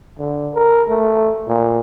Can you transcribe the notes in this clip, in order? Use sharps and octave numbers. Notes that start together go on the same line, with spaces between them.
D3
A#4
A3
A#2